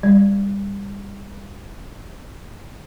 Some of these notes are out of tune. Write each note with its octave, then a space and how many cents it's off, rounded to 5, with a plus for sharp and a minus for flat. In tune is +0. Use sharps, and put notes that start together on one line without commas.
G3 +25 D5 +0